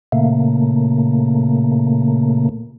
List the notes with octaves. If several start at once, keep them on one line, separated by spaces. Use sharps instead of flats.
A#2 C#3 A3 A#3